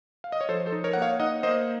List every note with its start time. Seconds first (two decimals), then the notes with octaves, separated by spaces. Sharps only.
0.24 F5
0.32 D#5
0.41 C#5
0.49 F3 A4 C5
0.66 A4 C5
0.72 D#4
0.84 A#4 C#5
0.93 A#3 F#5
1.02 C#5 F5
1.20 D#4 D#5 F#5
1.43 A#3 C5 D#5